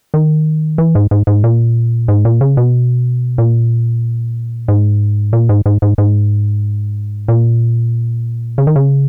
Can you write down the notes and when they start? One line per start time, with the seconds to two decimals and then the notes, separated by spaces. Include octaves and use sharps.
0.14 D#3
0.78 E3
0.95 G#2
1.11 G#2
1.27 G#2
1.44 A#2
2.08 G#2
2.25 A#2
2.41 C#3
2.57 B2
3.38 A#2
4.68 G#2
5.33 A#2
5.49 G#2
5.66 G#2
5.82 G#2
5.98 G#2
7.28 A#2
8.58 C#3
8.67 D#3
8.76 C#3